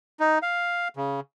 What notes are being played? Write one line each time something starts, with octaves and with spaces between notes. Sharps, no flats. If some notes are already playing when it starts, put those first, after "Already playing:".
D#4
F5
C#3